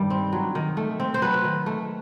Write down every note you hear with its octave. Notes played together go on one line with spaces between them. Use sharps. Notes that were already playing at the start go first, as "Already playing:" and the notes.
Already playing: G2 D#3 G3
C4
F#3
D#3
A3
C4
C5
F#3 B4
D#3
A3